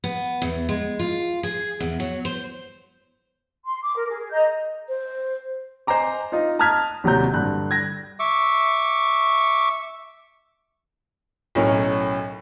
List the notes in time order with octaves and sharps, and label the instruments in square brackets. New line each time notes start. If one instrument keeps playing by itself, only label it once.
[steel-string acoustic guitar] B3
E2
G#3
F4
G#4
E2
F#3
C5
[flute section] C6
D6
A#4
G#4
D#5 A#5 G6
[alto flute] C5
[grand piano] C5 D#5 G#5 A#5 D6
D#4 F4
A5 A#5 D#6 F6 G#6 B6
D#1 C3 F#3 D5 A#5 G6
G2 D3 F#6
G#6 A#6
[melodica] E5 C#6 D6
[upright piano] B1 A2 C#4 A#4